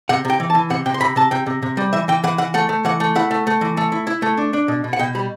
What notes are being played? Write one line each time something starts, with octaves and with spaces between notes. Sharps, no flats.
C3 F#5
C3 G5
E3
A5
E3
C3 F#5
C3 G5
C6
C3 B5
C3 A5
C3 G5
C3
C3
G3
E3 E5
E3 G5
E3 F#5
E3 F#5
A3 F#5
A3
E3 F#5
A3
E4 F#5
A3
A3
E3
A3
E4
E4
A3
D4
D4
B2
B2
F#5
B2 G5
G3 B5